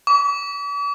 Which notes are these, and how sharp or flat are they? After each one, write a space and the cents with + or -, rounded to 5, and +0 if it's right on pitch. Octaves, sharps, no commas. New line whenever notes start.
D6 -45